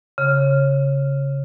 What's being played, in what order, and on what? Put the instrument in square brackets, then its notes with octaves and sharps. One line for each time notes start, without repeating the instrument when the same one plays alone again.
[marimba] C#3